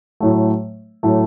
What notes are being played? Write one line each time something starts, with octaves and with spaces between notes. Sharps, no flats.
A2 F#3 A3
A2 F#3 A3